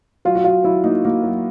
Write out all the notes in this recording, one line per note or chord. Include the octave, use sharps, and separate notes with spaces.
F#3 F4
F#4
F#3 F4
F#3 E4
A#3 D#4
A#3
F#3